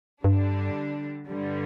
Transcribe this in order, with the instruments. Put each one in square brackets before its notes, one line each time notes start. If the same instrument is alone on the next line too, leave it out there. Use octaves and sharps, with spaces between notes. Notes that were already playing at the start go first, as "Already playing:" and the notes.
[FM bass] G2 [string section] D3 G3 D4
[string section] G2 D3 G3